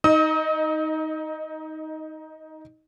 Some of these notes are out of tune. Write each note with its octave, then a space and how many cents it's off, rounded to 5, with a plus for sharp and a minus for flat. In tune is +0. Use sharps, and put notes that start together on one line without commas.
D#4 +15 D#5 -10 D#6 +45